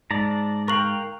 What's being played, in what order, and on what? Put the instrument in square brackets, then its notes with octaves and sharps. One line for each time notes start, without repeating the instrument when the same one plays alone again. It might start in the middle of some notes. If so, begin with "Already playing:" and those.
[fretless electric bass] G#2 [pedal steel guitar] D5 A5 A#5
[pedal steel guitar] A#4 F5 G5 [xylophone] C#6 F#6 F#7